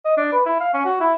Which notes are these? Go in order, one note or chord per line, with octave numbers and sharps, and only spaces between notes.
D#5
D4
B4
E4
F5
C#4
F#4
E4